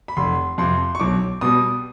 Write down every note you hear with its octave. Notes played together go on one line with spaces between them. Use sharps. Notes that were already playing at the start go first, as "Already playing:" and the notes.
B5
F1 C6
F2 C3 C6
C#6
B1 D6
B2 G3 D#6